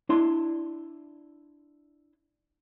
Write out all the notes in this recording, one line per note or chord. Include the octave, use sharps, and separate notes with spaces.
D4 E4 C6